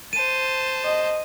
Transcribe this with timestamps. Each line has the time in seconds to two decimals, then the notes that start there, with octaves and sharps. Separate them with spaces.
0.13 C5 A5 D#7
0.85 D#5